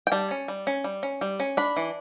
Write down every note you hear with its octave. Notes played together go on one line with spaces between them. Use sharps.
G5
G3 A5
C#4
G3
C#4
G3
C#4
G3
C#4
D4 B5
E3